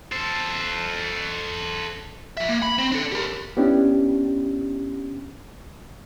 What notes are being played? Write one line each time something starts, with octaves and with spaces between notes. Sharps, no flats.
A4 C5
F3 E5
A#3
B5
C4
D4 A4
G4 A#4
B3 C#4 D4 E4 G4